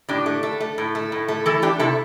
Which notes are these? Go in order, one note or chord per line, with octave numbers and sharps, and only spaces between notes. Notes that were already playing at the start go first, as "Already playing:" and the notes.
A2 D4 G4
A3
A3
A3
A2
A3
A2
A3
E3 E4 A4
A3 D4 G4
C3 E4 A4